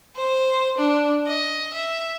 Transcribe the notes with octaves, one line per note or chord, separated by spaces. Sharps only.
C5
D4
D#5
E5